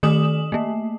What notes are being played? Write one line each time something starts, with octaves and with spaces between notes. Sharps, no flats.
D#3 A3 D#6 E7 F#7
A3 A#3